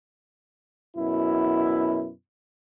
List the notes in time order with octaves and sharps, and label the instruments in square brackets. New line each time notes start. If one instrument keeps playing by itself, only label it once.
[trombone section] F#2 B2 E4